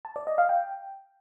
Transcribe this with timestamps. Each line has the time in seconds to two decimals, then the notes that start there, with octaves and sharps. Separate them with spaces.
0.05 A5
0.16 D5
0.27 D#5
0.38 F5
0.49 G5